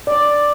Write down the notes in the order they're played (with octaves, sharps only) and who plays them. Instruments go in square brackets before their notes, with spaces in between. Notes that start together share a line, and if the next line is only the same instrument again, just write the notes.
[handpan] D5